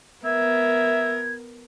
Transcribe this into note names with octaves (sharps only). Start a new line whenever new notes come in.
B3 A#4 E5 G#6